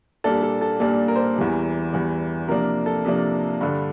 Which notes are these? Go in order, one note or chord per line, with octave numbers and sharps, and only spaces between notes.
A#2 G3 A#3 D4 A4
A4
A4
A#2 G3 A#3 D4 A4
A#4
C5
A#4
E2 E3 G3
E2 E3 G3
C3 F3 A#3 D4 A#4
A4
C3 F3 A#3 D4
G2 D3 G3